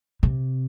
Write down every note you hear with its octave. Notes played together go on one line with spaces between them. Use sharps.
C3